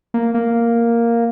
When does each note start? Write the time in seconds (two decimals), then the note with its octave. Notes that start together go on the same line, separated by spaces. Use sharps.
0.14 A#3
0.35 A#3